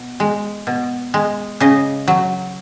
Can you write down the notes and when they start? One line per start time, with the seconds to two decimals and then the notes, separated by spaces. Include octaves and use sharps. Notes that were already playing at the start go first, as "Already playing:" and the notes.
Already playing: B2
0.20 G#3
0.67 B2
1.14 G#3
1.60 C#3 D#5
2.08 F#3